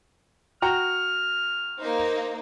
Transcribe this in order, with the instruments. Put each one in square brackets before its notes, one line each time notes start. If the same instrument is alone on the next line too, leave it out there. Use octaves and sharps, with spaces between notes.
[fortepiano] F#4 G5 A#5 [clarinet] F6
[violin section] A#3 D#4 C5